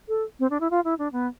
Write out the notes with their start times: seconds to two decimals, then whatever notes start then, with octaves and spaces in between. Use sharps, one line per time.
0.08 A4
0.39 C4
0.50 D4
0.60 E4
0.71 F4
0.84 E4
0.99 D4
1.12 B3